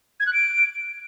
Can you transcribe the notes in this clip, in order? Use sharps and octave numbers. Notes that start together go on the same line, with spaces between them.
G#6
F#6
D7